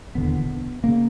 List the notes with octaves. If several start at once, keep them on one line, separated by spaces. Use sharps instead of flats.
E1 D#2 D3 B3
C#3 A#3